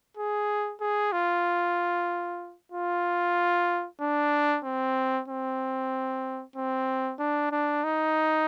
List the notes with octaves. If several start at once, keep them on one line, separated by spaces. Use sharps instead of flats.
G#4
G#4
F4
F4
D4
C4
C4
C4
D4
D4
D#4